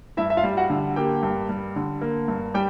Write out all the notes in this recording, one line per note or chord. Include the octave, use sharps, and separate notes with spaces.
G2 E4 E5
E5
F4 F5
G3
F#4 F#5
D3
A#3 G4 G5
G2
G3
D3
A#3
G2
G3 G4 G5